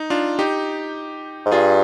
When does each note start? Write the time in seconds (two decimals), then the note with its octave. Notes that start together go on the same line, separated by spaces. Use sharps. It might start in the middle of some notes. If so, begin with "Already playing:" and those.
Already playing: D#4
0.10 D4 F4
0.39 D#4 G4
1.46 G#2
1.51 G2 F4 G#4